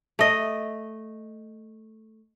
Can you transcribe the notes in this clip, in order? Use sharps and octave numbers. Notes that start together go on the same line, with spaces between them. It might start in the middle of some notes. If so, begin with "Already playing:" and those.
A3 D#5